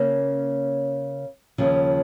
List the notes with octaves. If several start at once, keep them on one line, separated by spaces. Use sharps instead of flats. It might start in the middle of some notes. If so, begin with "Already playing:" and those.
Already playing: C#3 A#3 C#4
D#2 C#3 F3